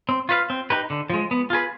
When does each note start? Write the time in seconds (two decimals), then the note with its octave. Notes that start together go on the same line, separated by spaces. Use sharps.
0.09 C4
0.29 F4 B4 F5
0.50 C4
0.70 D#4 G4 B4
0.90 D3
1.10 F3 G#3
1.31 B3
1.50 F4 G#4 B4